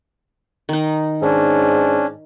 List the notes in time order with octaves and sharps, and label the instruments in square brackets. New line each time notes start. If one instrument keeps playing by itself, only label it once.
[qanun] D#3 D#4
[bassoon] G#2 [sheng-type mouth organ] C#4 D4